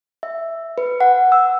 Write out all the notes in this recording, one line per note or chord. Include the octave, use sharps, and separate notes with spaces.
E5
B4
F#5
E6